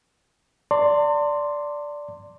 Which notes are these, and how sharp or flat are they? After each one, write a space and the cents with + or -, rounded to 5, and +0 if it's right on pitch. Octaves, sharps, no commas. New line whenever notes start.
D5 -5 A5 +45 C6 +0